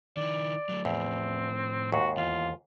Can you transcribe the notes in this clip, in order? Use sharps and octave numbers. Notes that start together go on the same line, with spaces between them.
D#3 E4 D5
F#3 A3
E2 A2 F3 C4
D#2 G#2 F#4
E2 F4